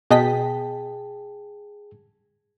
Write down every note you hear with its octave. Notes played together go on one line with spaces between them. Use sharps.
B2 G#4 D#5 G5 A5 B6